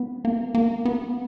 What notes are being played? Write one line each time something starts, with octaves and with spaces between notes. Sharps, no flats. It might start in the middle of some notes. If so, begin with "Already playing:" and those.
Already playing: B3
A#3
A#3
B3